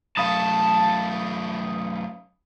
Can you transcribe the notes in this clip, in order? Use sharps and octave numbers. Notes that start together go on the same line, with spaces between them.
F#2 A3 F5 A5 B5 D#6